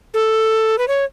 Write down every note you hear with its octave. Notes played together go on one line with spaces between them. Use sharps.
A4
B4
C#5